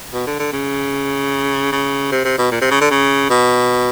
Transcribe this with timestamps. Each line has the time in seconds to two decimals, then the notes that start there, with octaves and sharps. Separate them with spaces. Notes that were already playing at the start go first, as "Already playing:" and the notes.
0.13 B2
0.27 D3
0.39 D3
0.53 C#3
1.72 C#3
2.12 C3
2.25 C3
2.38 B2
2.51 A#2
2.61 C3
2.71 C#3
2.81 D3
2.91 C#3
3.30 B2